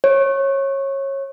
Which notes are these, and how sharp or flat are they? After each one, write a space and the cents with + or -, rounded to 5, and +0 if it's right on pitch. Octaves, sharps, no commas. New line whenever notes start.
C#5 -20